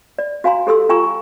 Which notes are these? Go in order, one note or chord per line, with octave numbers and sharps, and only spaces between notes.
D5
F#4 F5 G#5 A#5 C6
G4 A4 C6 E6
F4 G5 G#5 A#5 C#6 E6